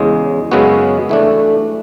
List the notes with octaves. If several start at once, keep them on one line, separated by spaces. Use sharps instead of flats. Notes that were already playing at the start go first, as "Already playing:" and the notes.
Already playing: E2 C#3 G#3
F#2 C#3 G#3 B3 F#4
E3 A3 D4